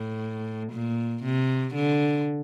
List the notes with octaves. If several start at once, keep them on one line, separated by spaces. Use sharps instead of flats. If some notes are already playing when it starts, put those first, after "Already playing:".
Already playing: A2
A#2
C3
D3